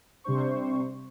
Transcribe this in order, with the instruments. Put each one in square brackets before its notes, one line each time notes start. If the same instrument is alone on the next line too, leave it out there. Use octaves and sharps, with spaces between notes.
[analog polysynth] C3 G3 D4 C5 C#6